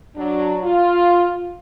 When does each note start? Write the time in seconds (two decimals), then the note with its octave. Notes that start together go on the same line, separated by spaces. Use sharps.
0.17 F#3 D4
0.63 F4